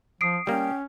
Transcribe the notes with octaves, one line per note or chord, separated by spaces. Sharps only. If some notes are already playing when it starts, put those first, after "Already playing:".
F3 D#6 C7 D7
G3 A#3 C#4 G5